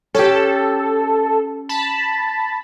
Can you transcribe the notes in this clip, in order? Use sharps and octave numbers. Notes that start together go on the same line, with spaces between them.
C#4 G4 A4
A5 B5